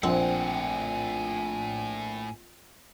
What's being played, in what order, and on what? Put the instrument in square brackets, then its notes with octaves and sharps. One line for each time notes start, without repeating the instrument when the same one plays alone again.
[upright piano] A#1 [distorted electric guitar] A2 F#5 [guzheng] C4 [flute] G#5